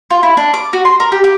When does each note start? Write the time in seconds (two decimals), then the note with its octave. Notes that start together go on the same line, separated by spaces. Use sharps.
0.11 F4
0.23 E4
0.37 D4
0.54 D6
0.73 F#4
0.85 C6
1.00 A#4
1.12 G4
1.24 G4